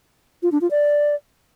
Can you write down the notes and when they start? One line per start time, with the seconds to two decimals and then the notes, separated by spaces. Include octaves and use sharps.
0.43 F4
0.52 D4
0.61 F4
0.71 D5